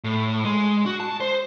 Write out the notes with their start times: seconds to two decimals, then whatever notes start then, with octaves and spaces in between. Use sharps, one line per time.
0.04 A2
0.44 G#3
0.86 F#4
1.00 A5
1.20 C5